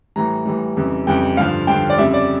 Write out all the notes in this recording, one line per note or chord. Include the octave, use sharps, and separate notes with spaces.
A2 E3 G3 A#5
A2 E3 G3
F2 C#3 E3 G3
F2 C#3 E3 G3 G5
G2 D3 F3 F5
G2 D3 F3 G5
D5
F2 C#3 G3 E5
D5